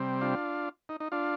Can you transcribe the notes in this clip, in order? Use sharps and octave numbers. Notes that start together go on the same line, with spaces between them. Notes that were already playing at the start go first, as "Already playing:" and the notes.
Already playing: C3 G3 C4
D4 F4
D#4
D#4
D4 F4